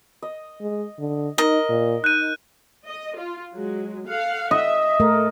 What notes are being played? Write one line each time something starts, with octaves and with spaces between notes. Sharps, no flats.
D#5
G#3
D3
D#4 A#4 D#5
A#2
D#4 F#6 G6 D#7
D#5
F4
F#3 G#3
A4 F5 F#5
D#5 E5
A3 A4 A#4